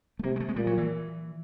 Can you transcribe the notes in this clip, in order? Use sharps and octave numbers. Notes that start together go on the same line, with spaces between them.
A3
C3 A#3
G#3
A3
G#3
A#2 G3
F#3
E3